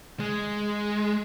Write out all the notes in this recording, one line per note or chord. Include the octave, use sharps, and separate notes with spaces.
G#3